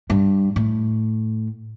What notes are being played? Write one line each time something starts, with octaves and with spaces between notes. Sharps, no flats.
G2
A2